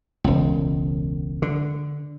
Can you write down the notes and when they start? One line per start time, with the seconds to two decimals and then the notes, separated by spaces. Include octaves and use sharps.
0.24 E1 C#2
1.42 D3